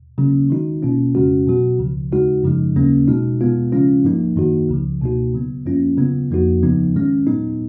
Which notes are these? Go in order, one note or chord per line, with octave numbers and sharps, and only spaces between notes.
C#3 F#3 A#3 C#4
D#3 G#3 D#4 F#4
B2 A#3 C#4 F4
F2 C#3 G#3 C#4 F#4
B2 F#3 B3 F#4
C#2 C#3 F3
D#2 C#3 G#3 D#4 F#4
F#2 C#3 F3 G#3 D#4
D#2 C#3 F#3 A#3 C#4
B2 G#3 D#4 F#4
B2 G#3 B3 F4
C#3 F3 G#3 C#4 F4
G#2 F3 A#3 D#4
F#2 D#3 A#3 D#4 F#4
C#2 C#3 F3
C#2 B2 A#3 D#4 F#4
C#3 F#3 B3
F#2 F3 A#3 C#4 F4
C#3 F#3 B3 F4
F2 F3 A#3 D#4 F#4
D#2 C#3 F3 B3 D#4
G#2 D#3 G#3 C#4
A#2 F#3 B3 D#4